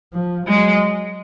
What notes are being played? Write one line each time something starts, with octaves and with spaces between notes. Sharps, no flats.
F3
F#3 G#3